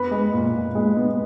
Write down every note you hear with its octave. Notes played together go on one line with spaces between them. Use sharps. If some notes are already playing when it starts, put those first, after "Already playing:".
Already playing: B3 B4 B5
G#3
A#2
A#2
G#3
B3